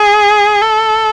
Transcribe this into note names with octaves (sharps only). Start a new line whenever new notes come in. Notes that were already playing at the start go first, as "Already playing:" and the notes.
Already playing: G#4
A4